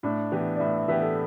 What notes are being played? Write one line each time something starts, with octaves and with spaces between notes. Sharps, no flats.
A2 D4
E3 B3 G4
D5
A2 E5
E5
E3 B3 G4 E5
A4